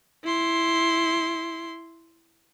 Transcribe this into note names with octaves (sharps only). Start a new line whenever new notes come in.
E4 C6